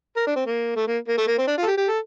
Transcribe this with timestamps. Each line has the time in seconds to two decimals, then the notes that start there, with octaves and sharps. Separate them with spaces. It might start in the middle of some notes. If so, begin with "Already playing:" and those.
0.17 A#4
0.27 D4
0.36 C4
0.46 A#3
0.76 A3
0.87 A#3
1.08 A#3
1.18 A3
1.28 A#3
1.38 C4
1.48 D4
1.58 F4 A4
1.67 G4
1.77 G4
1.88 A4